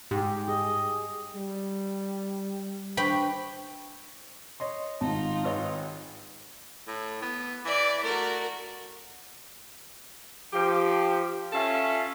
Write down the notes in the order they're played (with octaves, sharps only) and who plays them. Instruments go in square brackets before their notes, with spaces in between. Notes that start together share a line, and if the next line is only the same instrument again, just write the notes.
[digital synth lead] G#2 [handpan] G4
[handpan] G#4 [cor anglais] D#5
[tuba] G3
[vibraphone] D4 C5 C#6 [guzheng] B4 G5 B5
[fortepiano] C#5 D#5 C6
[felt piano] G#1 [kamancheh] D#4 F4 [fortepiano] A5
[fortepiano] G#1 C#5 D#5 [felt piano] B4
[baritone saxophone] A2
B3
[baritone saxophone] E3 [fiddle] D5 E5
[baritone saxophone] A3 [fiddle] F#4 A#4
[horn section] F3 G4
C#4 F4 A4 E5